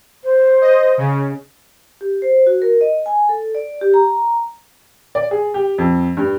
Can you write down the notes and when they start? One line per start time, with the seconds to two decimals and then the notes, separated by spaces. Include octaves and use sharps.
0.24 C5
0.61 D#5
0.98 C#3
2.01 G4
2.22 C5
2.47 F#4
2.62 A#4
2.81 D#5
3.06 G#5
3.29 A4
3.55 D5
3.81 G4
3.94 A#5
5.15 D5
5.31 G#4
5.54 G4
5.78 F2
6.17 G2